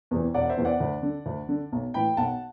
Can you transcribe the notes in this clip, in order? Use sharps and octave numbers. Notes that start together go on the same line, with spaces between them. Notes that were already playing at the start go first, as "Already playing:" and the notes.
E2 C3 E3
E1 D5 F#5
C5 E5
E2 C3 E3
D5 F#5
D2
D3
D2
D3
B1
A2 E3 G5 B5
B1 F#5 A5